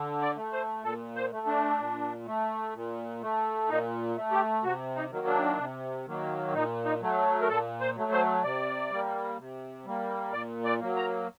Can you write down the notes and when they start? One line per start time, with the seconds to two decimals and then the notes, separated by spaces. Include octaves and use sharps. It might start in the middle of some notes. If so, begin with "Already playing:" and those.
Already playing: D3
0.22 D5
0.36 A3
0.53 C5
0.84 A#2 A4
1.16 C5
1.32 A3
1.47 D4
1.79 A#2
2.26 A3
2.75 A#2
3.22 A3
3.69 A#2 D#4
4.17 A3
4.32 G4
4.63 C3 F#4
4.95 D#4
5.11 D#3 F#3 A#3
5.27 D4
5.58 C3
6.07 D#3 F#3 A#3
6.54 A#2 D#4
6.85 D#4
7.01 F#3 A3
7.42 A#4
7.49 A#2 A4
7.81 C5
7.96 F#3 A3
8.12 C5
8.43 C3 D5
8.90 G3 A#3
9.38 C3
9.85 G3 A#3
10.33 A#2 D5
10.65 D5
10.80 F#3 A#3
10.96 A#5